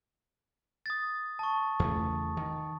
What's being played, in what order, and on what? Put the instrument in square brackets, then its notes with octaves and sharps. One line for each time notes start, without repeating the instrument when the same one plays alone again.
[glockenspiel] D#6 A6
A5 C#6
[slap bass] E2 C#3 A3
D#3